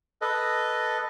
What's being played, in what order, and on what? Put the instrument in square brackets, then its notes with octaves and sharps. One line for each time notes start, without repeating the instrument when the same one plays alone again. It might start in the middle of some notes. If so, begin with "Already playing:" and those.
[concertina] A4 B4 D#5